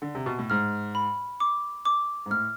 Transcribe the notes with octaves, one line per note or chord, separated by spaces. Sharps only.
D3
C3
B2
A2
G#2 F6
B5
D6
D6
G#2
A2 F6